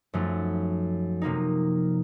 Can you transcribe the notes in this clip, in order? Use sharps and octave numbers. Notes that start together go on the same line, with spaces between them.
F#2 F3 A3 D#4
C3 F3 A#3 D#4